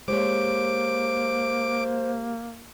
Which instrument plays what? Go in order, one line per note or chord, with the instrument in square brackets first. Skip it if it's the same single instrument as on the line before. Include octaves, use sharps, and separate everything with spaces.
[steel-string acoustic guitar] G#3 G4 C#5 [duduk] A#3 [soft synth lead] C5 [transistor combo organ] D6